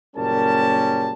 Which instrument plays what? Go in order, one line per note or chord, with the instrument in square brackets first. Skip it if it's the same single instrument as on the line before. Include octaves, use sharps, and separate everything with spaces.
[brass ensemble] F#1 A#2 G3 C#4 A#4 A5